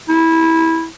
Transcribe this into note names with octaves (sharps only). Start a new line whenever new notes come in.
E4